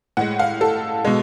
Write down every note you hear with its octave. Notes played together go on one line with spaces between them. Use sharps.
A2 G#3 F#5
F5
A4
B2 G#3